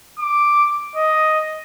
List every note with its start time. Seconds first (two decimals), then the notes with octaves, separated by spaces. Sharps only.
0.19 D6
0.96 D#5